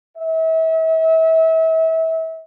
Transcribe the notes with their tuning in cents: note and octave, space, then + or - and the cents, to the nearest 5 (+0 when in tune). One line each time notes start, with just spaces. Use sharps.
E5 -35